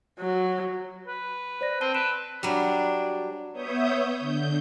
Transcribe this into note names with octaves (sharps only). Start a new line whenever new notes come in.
F#3
B4
C5 D5 A#6
C4 A5 D#7 G7
B4 D7 E7
F#3 G3 D4
B3 C#5 E5 D#6 G6
D3 G6